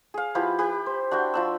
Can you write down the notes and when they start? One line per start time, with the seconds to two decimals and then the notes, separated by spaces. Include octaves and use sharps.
0.14 G#4 F5
0.35 F3 E4 G4 B4
0.59 G4 B4
0.86 C5
1.11 D4 F#4 E5 G5
1.34 F3 D4 E6